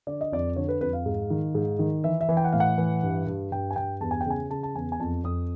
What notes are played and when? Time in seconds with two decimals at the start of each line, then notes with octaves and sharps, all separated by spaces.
0.07 D3 D5
0.21 D#5
0.32 F2 D5
0.56 D3 C#5
0.69 B4
0.81 F2 B4
0.93 F5
1.06 G#2
1.30 D#3
1.55 G#2
1.79 D#3
2.04 E3 E5
2.21 E5
2.29 E3
2.37 G5
2.44 F#5
2.53 A2 F5
2.60 F#5
2.78 E3
3.03 G2
3.27 G2
3.52 G2 G5
3.71 G#5
3.76 G2 G5
4.01 E2 A5
4.11 G#5
4.21 G5
4.26 C#3 G#5
4.50 C#3 A5
4.63 A5
4.75 E2 G#5
4.92 G#5
5.00 F2 A5
5.24 F2 D#6